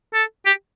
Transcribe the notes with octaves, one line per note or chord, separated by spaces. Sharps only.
A4
G4